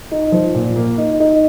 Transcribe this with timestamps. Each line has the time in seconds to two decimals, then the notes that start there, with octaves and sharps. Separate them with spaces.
0.11 D#4
0.32 F3
0.55 A#2
0.76 A#3
0.98 D#4
1.20 D#4